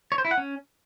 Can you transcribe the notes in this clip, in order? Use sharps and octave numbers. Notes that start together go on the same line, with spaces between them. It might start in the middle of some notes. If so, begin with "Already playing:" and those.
C#5
C5
E4
F#5
C#4